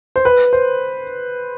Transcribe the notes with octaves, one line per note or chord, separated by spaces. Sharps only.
C5
B4
C5